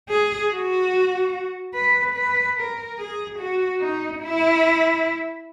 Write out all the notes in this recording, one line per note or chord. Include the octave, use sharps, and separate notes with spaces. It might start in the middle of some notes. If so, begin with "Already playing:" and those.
G#4
F#4
B4
B4
A#4
G#4
F#4
D#4
E4